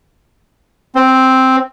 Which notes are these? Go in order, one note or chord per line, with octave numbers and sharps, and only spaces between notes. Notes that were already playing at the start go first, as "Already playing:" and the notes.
C4